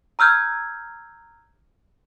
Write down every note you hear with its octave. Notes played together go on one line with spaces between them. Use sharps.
A#5 E6 F6 G6 G#6